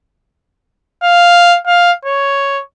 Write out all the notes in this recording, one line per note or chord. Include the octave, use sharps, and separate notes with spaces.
F5
F5
C#5